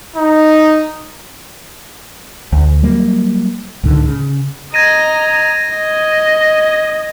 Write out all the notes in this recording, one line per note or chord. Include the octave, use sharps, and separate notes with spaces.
D#4
D2
F#3 G3 A#3
C#2 A2 D3 D#3
C#3
D#5 A#5 G#6 A#6 D#7
D#5